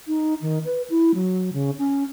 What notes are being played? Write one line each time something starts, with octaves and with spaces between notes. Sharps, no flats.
D#4
D#3
B4
E4
F#3
C#3
C#4